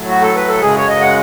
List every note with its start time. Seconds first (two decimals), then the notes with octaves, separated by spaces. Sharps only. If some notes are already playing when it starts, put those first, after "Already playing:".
Already playing: A2 F#3 A3
0.09 F#4
0.22 A4
0.36 B4
0.48 A4
0.61 F#2 C#3 G#3 G#4
0.77 C#5
0.89 D#5
1.01 F#5